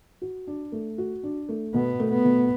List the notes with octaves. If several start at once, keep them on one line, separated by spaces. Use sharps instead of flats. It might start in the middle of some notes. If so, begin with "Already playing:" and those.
F#4
D4
A3
F#4
D4
A3
B2 B3
A3
B3
B2